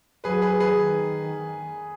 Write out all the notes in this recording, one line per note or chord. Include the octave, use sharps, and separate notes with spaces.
F#3 G#4 B4
G#4 B4
G#4 B4
D#3